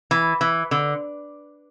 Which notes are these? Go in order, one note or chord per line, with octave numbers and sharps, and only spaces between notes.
E3
E3
D3